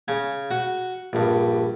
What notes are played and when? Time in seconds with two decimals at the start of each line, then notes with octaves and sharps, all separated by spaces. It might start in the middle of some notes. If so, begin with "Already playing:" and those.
0.08 C#3 G#5
0.51 F#4
1.13 A#1 G2